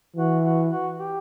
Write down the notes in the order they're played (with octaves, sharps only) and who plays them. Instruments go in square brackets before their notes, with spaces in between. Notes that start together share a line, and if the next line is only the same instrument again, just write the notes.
[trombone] E3 [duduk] F#4
[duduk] F#4
F#4
G4